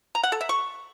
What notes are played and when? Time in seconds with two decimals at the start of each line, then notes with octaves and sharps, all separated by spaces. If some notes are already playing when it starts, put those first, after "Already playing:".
0.15 A#5
0.23 F#5
0.32 A4
0.41 E5
0.49 C#6